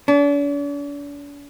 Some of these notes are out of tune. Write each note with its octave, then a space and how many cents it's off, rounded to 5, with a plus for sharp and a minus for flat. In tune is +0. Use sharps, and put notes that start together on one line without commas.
D4 -45